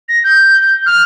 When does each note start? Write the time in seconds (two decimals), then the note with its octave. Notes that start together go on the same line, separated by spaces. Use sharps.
0.09 A#6
0.24 G6
0.86 F6